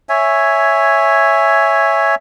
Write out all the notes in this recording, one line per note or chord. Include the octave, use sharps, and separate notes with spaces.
C#5 E5 G#5